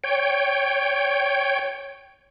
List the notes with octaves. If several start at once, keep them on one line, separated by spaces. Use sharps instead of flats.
C#5 G5